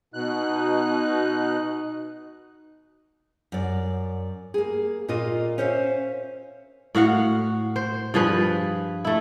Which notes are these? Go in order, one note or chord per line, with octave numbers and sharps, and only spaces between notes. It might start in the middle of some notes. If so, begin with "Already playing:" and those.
B2 D#4 F#6
F#2 D5
A#3 G#4
A#2 A#3 F4 D#5
C#4 C5 C#5 E5 F5
A2 F#4 F5 F#5
C5
G2 F3 G#4 B4
A3 E4